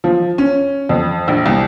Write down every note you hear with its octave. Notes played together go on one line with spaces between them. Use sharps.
F3
C#4
F2
A#1
C2